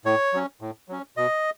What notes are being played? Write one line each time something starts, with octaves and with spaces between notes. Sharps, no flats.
A2 C#5
F#3 C#4
A2
F#3 C#4
B2 D#5